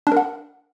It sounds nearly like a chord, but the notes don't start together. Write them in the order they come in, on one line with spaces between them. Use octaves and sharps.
D4 A#4 F#5